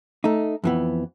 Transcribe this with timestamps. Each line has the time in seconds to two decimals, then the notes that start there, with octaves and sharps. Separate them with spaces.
0.24 A3 D#4
0.64 F2 E3 B3